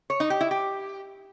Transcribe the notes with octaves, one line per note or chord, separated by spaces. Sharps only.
C#5
D#4
G4
E4
G4